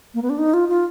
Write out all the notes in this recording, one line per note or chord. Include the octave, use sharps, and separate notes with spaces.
A#3
B3
D4
D#4
F4
F4